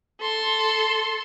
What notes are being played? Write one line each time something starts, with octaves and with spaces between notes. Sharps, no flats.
A4 C6